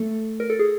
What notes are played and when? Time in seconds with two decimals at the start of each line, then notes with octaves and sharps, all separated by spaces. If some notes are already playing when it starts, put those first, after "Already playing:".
Already playing: A3 A4
0.40 A#4
0.50 A4
0.59 G#4